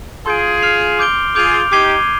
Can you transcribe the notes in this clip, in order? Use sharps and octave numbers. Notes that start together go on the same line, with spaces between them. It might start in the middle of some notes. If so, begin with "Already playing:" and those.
F4 G#4 C6 G6 D7
F6 C7 F7
D6 G6 D7 G7
F4 G#4 D6 G6 D7 F7
D#4 G4 D6 G#6 C7 D#7 G7